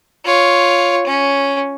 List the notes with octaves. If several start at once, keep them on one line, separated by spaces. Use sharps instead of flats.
F4 C#5
C#4